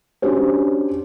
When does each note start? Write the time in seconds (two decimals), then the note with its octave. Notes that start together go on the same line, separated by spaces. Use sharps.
0.22 C#4 D4 F#4 G4 C5